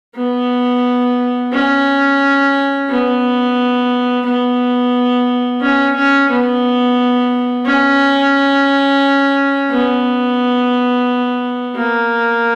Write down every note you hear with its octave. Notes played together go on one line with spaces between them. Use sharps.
B3
C#4
B3
B3
C#4
C#4
B3
C#4
B3
A#3